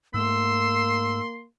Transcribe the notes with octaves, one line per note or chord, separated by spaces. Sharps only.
G#2 A3 A#3 C6 E6